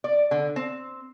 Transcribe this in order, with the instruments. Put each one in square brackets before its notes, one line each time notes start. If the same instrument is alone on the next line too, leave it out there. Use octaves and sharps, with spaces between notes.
[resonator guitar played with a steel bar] D5
D3
C4